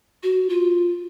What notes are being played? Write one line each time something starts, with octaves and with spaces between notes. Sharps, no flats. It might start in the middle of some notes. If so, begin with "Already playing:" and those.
F#4
F4